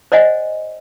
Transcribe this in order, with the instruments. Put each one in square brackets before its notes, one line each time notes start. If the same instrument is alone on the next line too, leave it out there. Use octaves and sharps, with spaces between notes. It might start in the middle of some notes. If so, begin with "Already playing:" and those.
[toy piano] C5 D5 D#5 F#5 G#5